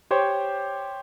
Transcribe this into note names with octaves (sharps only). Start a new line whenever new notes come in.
G4 C5 C#5 G5